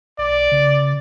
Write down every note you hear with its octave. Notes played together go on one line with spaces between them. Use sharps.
B1 D5
C#3